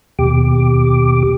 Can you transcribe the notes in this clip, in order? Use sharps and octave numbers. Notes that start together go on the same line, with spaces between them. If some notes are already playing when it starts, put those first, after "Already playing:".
D#2 B2 G4 D6